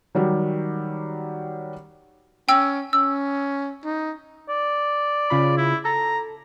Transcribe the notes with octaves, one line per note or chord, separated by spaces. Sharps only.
D#3 F#3 G3 G4
C#4 G5 E6
C#4 E6
D#4
D5
C#3 F4 B5
E4
A4 A#5